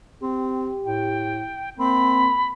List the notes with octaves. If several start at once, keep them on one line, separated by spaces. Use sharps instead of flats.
C4 G4
A2 G5
A#3 C4 B5